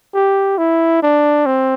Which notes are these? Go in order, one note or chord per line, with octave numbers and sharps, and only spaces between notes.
G4
E4
D4
C4